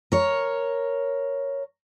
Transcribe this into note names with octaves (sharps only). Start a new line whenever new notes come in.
A#4 C#5